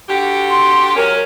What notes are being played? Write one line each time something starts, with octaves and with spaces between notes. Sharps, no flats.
D3 F#4 G4
C6
F#3 G#3 C#4 A#4